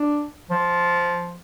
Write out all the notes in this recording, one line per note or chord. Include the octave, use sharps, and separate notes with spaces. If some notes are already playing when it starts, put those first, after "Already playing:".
Already playing: D4
F3